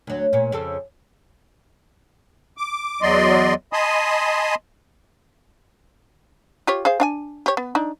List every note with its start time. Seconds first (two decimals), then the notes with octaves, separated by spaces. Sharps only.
0.07 D2 F#3
0.33 A#2 C#4
0.52 F2 C#3 A4
2.57 D6
3.02 E2 F#3 D5 D#5 C6
3.73 D#5 G#5 A5 B5 C6 D#6
6.67 F4 G4 C#5
6.85 G#4 C5 F5
7.00 D4 F5 G#5
7.46 G4 C#5
7.57 B3
7.75 D4 D#4